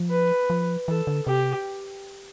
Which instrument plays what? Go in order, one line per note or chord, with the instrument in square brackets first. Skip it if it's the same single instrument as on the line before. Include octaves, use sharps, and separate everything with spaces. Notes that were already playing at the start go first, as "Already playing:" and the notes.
Already playing: [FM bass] F3
[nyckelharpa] B4
[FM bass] F3
[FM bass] E3 [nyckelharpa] A4
[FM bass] D3
[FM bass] C3 [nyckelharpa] G4